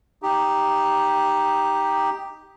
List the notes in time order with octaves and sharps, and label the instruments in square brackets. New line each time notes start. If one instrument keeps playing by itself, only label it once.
[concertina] D#4 G4